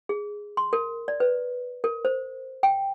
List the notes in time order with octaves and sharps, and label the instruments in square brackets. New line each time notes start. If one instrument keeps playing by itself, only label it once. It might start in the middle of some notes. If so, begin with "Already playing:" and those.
[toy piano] G#4
C6
A#4
D5
B4
A#4
C5
G5